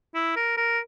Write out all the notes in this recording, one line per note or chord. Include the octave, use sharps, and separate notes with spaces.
E4
A#4
A#4